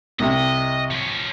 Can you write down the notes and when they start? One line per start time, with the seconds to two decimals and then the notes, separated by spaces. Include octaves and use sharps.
0.20 C2 C3 D#5
0.91 F3 C#4